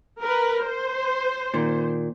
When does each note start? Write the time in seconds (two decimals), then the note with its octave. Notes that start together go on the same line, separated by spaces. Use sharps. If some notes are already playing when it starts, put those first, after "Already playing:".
0.20 A#4 B4
0.64 C5
1.54 A#2 D#3